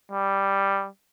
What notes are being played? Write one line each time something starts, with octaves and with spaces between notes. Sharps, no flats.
G3